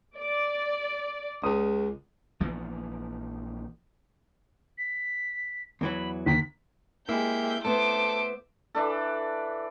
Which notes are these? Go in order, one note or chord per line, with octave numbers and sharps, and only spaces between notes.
D5
C#2 D#6
A#1 E3 F3 B3
B6
E2 E3 F#3 B5
D#2 B6
G#3 A#3 E4 G4 E5 G6
A3 B3 A4 C5 E5 D6
E3 D4 A4